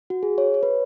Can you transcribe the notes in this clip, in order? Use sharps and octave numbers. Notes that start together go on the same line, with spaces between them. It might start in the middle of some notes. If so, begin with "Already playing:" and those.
F#4
G#4
C#5
C#5
B4